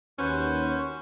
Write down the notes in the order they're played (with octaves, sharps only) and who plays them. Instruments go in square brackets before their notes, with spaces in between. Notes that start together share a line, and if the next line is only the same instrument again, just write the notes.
[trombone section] D#2 [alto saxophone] C#4 [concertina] F#4 B4 C5